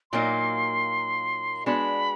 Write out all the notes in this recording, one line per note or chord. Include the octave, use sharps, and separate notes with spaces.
A#2 F#3 A#3 D#4 C6
G#3 B3 D4 F#4 B5